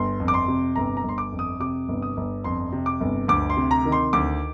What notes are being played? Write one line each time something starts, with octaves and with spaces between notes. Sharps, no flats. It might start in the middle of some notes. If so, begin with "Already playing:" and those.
Already playing: G1 C6
F2
D6
C6
C3
G1 A#5
A#5
G1
C6
D6
F2
D#6
C3 D6
G1
D#6
G1
F2 C6
C3
D6
G1
D2 D6
C6
C3
A#5
D#3
C6
D2 D6